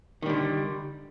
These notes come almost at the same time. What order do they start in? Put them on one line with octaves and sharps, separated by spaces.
D#3 G3 D3